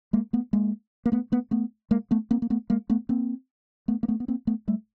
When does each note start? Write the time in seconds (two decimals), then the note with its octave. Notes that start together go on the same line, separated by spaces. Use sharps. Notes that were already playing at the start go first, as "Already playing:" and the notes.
0.13 G#3 A#3
0.33 A3 B3
0.53 G#3 A#3
1.06 A#3
1.12 A3 B3
1.32 A3 B3
1.51 A3 B3
1.91 G#3 A#3
2.11 A3 B3
2.31 A#3 C4
2.42 A#3
2.50 A3 B3
2.70 G#3 A#3
2.90 A3 B3
3.09 A#3 C4
3.88 A3 B3
4.03 A#3
4.08 A3 B3
4.20 B3
4.28 A#3 C4
4.47 A3 B3
4.68 G3 A3